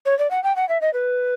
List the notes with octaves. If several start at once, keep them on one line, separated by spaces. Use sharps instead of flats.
C#5
D5
F#5
G5
F#5
E5
D#5
B4